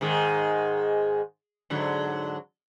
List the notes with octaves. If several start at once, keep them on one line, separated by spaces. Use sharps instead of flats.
G#2 D#3 G#3
G#2 D3 F#3